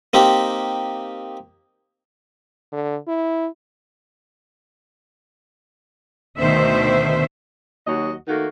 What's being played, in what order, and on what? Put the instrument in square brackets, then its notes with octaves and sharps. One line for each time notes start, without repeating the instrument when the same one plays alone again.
[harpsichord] A#3 C4 D#4 G4
[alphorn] D3
E4
[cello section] D2 B2 D#3 C5 E5
[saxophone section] D#2 F#3 F#4 D#5
D#3 A3 A#3 F#4